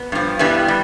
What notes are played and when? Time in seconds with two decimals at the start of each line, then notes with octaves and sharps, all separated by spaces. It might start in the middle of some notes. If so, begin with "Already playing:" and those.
Already playing: B3
0.12 G2 F3
0.39 G2 E3 G3 B3
0.68 G3